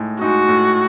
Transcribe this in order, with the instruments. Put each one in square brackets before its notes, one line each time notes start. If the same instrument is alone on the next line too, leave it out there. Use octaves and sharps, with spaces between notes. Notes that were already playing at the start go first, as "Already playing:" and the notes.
Already playing: [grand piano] A2 G#3 D#4
[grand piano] G#3 D#4 [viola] F#4
[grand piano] A2